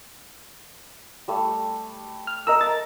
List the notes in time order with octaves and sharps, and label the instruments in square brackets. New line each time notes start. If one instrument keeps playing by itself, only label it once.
[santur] G3 A3
[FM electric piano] F6
[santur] A4 A#4 [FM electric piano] D#5 A#5 E6
[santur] E5 [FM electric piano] A#5 A6